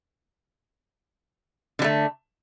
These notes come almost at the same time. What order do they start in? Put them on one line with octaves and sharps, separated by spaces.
D3 G3 A3